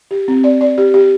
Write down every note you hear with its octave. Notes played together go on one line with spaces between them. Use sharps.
G4
C4
D5
D5
G4
G4